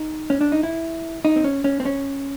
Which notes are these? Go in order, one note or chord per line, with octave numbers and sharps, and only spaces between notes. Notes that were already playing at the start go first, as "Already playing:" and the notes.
Already playing: D#4
C#4
D4
D#4
E4
D#4
C4
C#4
C#4
C4
C#4